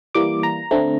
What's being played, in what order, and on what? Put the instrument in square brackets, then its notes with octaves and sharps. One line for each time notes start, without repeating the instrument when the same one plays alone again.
[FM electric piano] E3 G3 A#3 D6
A#5
D3 A3 C4